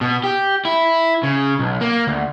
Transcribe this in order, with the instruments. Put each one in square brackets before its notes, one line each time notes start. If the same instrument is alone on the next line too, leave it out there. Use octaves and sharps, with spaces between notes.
[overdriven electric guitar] B2
G4
E4
C#3
B1
A#3
D2